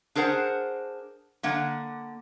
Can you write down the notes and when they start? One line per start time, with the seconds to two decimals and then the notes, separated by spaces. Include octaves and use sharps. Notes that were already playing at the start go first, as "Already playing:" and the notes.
0.15 D4 G#4 A#4 C5 F#5
1.43 D3 A#3 F#5